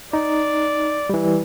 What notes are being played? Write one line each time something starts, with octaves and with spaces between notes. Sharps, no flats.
D#4 D5
E3 G3